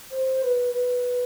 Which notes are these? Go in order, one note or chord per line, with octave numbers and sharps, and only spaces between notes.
C5
B4
B4